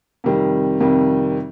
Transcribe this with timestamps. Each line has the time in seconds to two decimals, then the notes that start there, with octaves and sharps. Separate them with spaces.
0.24 F2 C3 D#3 G3
0.80 F2 C3 D#3 G3